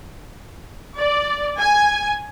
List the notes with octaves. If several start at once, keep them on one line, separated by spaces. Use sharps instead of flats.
D5
G#5